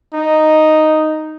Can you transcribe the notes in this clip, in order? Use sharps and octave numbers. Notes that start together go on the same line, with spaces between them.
D#4